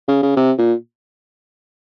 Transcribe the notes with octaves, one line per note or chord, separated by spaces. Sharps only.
C#3
C#3
C3
A#2